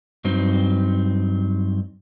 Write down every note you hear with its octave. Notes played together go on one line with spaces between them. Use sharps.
G2 F#3 C4 D#4